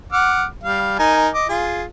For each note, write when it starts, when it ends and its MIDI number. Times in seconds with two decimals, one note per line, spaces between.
0.12 0.45 78
0.12 0.45 86
0.12 0.45 89
0.64 0.96 55
0.64 0.96 77
0.99 1.28 63
0.99 1.28 70
0.99 1.28 80
1.34 1.47 75
1.34 1.47 86
1.49 1.84 65
1.49 1.84 68